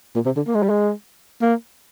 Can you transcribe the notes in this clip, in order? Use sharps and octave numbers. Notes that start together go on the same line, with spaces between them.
A#2
C3
D3
A#3
G#3
G3
G#3
A#3